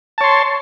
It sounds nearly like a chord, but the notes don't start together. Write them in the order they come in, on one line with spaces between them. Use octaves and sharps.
A5 C#5 C6